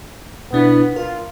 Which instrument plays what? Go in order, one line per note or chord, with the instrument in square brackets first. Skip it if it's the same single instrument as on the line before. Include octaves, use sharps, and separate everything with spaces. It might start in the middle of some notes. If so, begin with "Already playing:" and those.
[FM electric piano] B2 D4 E4 [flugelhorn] B3
[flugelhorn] F4 [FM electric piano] A#4